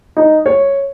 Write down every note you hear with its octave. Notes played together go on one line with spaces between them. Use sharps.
D#4
C#5